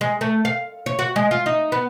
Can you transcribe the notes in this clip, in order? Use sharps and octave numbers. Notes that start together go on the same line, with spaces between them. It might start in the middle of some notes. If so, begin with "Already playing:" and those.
G#3
A3
F5
C#5
F#4
G#3
F4
D#4
B3